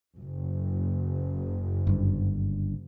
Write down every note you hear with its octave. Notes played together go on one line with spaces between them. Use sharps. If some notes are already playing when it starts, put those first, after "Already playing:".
F#1
G1 G2